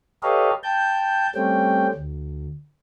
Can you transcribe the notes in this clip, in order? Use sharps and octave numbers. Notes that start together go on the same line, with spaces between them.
G4 A4 B4 C#5 D#5 F5
G5 A5 G6
G3 A3 C4 C#4 G5
D2